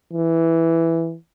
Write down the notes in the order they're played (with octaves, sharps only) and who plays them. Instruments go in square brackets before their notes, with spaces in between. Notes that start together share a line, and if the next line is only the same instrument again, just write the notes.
[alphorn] E3